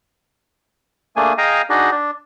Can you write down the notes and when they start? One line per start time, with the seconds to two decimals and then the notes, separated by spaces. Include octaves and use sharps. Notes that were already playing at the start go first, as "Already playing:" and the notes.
1.16 A3 A#3 D4 G#4 G#5
1.38 G#4 D#5 F5 G5 G#5 A#5
1.70 D4 D#4 F#4 G#4 D#5
1.91 D4